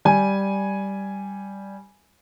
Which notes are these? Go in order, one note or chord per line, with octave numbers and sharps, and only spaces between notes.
G3 G#5